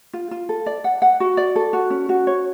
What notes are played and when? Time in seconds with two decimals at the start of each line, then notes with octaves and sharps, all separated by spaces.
0.13 F4
0.31 F4
0.49 A4
0.66 D5
0.84 F#5
1.02 F#5
1.20 F#4
1.37 D5
1.56 A4
1.73 F#4
1.90 C#4
2.09 F#4
2.27 C#5